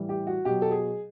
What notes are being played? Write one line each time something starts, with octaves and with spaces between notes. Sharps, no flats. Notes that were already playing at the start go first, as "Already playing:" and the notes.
Already playing: A2 E3 G3
G4
F#4
B2 F#3 G4
A4
G#4